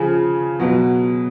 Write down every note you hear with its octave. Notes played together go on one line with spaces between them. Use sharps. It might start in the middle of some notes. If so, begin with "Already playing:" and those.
Already playing: C#3 F3 G#4
B2 F#3